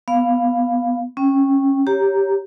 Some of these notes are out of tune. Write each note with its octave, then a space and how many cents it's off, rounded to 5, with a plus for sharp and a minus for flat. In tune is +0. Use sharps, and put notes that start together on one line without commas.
B3 +0 F5 +0
C#4 -15 G5 +0
G4 +0 C#5 +0 A#5 +0